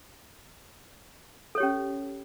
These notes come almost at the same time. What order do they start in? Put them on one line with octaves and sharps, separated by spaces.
A4 C#5 G4 C#4